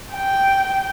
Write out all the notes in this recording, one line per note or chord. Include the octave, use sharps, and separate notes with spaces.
G5